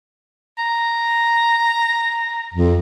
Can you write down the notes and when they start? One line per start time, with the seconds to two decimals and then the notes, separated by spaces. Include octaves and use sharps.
0.58 A#5
2.55 F2